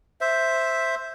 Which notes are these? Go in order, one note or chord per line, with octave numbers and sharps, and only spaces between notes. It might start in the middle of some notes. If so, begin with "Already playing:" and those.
C5 E5